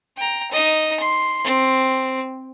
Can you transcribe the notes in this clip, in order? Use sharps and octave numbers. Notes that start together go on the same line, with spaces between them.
G5 A#5
D#4 D#5
C6
C4